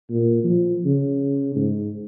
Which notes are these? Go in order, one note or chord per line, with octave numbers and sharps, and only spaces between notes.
A#2
F3
C#3
G#2